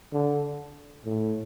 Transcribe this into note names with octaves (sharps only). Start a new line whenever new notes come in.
D3
A2